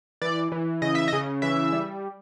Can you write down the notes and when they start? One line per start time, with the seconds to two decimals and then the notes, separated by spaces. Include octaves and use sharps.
0.22 E3 D5
0.52 E3
0.82 C#3 D#5
0.95 E5
1.08 C#3 D#5
1.42 E3 E5
1.72 G3